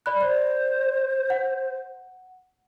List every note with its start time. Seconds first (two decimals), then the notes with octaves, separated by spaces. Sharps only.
0.06 D5 B5 F#6
0.21 C5 D5
1.30 F#5